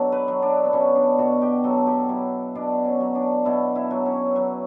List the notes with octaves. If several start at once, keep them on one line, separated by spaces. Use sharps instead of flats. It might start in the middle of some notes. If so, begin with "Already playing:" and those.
Already playing: B2 F#3 B3 D4 A4
B4
F#3
D4
B3
B2 C#4
D4
B2 F#4
G4
F#3 A4
G4
F#3 E4
B2 D4
C#4
F#3
D4
B2 E4
E4
F#3
C#4
F#3